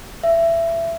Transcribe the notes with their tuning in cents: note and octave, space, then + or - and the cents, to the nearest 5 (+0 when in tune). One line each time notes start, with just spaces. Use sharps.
E5 +20